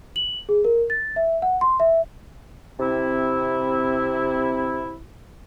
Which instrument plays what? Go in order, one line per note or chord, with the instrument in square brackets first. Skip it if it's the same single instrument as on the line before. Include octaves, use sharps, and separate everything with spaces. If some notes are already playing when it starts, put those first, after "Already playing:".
[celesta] F#7
G#4
A#4
A6
E5
F#5
C6
E5
[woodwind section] C3 C4 E4